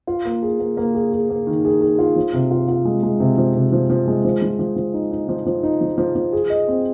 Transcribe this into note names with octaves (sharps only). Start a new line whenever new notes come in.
F4
A#3
G#4
A#3
A#3
G#4
G#4
A#3
D#3
G#4
G#4
F4
F3
C3
F4
F4
G#3
G#3
C3
F3
C3
F3
F3
G#3
F3
F3
F3
F3
D#4
D#4
F3
F3
D#4
F3
F3
F3
G#4
D#5
C4